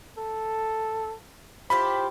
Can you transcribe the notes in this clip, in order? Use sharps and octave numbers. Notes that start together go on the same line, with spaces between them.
A4
E4 F4 G4 C5 B5